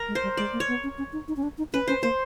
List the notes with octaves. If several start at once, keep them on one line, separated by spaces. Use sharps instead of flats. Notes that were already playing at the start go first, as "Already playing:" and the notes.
Already playing: A#4
G#3
C5
G3
G#3 D5
A#3
C#5
B3
C#4
C#4
D#4
D#4
C#4
D4
D#4
C#4 B4
C#4 C5
A#3 C5